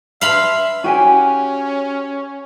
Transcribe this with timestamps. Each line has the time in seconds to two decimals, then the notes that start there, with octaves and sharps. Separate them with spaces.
0.21 E5 F5 B5 C6
0.84 C#4 F#4 G4 G#5